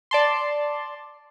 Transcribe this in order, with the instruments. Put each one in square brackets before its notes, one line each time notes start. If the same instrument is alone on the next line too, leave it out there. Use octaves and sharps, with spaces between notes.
[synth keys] D5 A5 C6